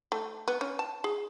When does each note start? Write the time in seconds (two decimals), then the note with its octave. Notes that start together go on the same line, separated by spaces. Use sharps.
0.12 A3
0.48 B3
0.61 C#4
0.79 A5
1.04 G#4